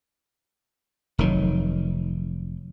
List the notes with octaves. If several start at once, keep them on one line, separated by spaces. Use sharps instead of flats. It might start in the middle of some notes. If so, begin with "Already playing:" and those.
F1 D#3 F#3